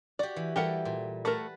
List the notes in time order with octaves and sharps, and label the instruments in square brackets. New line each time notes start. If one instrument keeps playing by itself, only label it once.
[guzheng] F#4 G4 [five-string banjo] D5
[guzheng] E3
[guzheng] E3 G3 A4 [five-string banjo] G4 A#4 F#5
[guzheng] A#2
[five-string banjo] A3 A#4 [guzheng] B4 F#5 A5